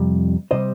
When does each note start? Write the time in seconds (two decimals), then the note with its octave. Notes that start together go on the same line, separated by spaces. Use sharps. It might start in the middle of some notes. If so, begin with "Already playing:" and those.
Already playing: F2 C3 G3
0.51 C3 G3 C5 D#5